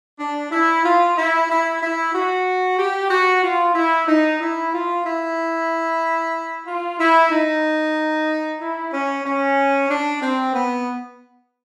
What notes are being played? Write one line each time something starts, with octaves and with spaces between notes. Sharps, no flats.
D4
E4
F4
E4
E4
E4
F#4
G4
F#4
F4
E4
D#4
E4
F4
E4
F4
E4
D#4
E4
C#4
C#4
D4
C4
B3